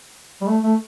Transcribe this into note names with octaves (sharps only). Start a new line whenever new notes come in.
G3
A3
A3